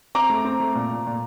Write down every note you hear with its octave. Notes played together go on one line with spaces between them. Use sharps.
C4 A#5 D6
A3
C4
A3
A#2
A#2
A#2